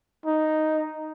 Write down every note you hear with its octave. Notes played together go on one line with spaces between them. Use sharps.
D#4